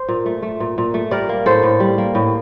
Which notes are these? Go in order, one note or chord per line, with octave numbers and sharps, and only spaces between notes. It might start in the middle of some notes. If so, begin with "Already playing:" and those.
Already playing: C5
A#2
A3
A3
A#2
A#2
A3
G3 A#4 D5
A#3
A2 A4 C5
A2
G3
A#3
A2